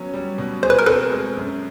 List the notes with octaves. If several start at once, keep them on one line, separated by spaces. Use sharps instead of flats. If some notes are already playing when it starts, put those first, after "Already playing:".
Already playing: F#3 B3 C#4
G3
B2
G#4 C5
B4
A#4
C4 A4 B4
G#3
F#2